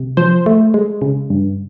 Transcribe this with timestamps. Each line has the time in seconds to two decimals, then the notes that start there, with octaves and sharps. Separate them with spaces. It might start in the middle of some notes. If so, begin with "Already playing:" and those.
Already playing: C3
0.17 F3 C5
0.46 A3
0.74 G#3
1.02 C#3
1.30 G2